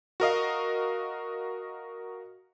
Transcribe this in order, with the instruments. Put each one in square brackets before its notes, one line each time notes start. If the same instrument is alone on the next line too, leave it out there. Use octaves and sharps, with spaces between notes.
[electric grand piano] F#4 A#4 D#5 F5